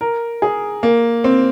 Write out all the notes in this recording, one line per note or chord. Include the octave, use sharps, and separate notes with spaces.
A#4
G#4
A#3
C4